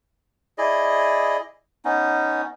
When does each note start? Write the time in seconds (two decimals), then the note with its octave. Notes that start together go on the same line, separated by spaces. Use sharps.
0.58 E4 G#4 D5 D#5
1.85 B3 C#4 D#4